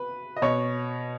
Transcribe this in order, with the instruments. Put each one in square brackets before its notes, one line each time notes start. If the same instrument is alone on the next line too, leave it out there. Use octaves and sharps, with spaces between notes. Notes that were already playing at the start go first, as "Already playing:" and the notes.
Already playing: [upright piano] B4
D#5
B2 C#5